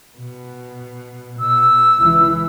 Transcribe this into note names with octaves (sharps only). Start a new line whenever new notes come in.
B2
B2 E6
C#2 E3